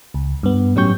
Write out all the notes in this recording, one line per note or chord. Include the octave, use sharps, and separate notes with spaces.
C#2
G2 B3
A2 F#3 C#4 G4 C#6 G6